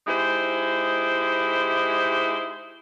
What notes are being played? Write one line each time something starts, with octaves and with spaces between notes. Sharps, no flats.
G#3 D#4 E4 G4 C5